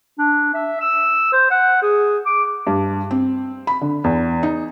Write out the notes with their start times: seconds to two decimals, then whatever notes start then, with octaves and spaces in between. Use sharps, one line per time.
0.18 D4
0.54 E5
0.80 E6
1.33 C5
1.51 F#5
1.82 G#4
2.25 D6
2.67 G2
3.11 C4
3.67 B5
3.81 D3
4.04 E2
4.43 D#4